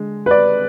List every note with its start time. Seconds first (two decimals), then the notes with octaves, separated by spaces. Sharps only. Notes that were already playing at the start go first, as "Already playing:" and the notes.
Already playing: D3 G#3
0.26 B4
0.31 D5